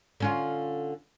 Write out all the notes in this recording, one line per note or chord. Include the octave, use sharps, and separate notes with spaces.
D3 C#4 F4